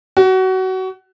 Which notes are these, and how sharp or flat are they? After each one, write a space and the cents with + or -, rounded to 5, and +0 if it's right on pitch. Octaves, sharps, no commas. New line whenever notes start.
F#4 +25